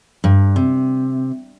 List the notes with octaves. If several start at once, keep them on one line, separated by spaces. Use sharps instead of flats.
G2
C3